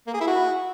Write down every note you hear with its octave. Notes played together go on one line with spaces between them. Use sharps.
A#3
G#4
E4
F#4